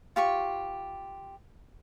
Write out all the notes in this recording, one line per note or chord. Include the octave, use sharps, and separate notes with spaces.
F4 G4 C#6